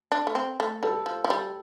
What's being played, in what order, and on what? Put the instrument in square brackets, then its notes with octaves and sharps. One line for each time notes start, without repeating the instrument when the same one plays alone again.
[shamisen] D4
A3
C4
A3
[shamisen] G3 [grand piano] A4
[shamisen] F3
F3
G3